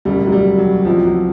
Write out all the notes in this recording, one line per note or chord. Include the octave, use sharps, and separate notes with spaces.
E1 D2 C#3 G3
F#3
G3
F#3
C#2 C3 E3 F3
F#3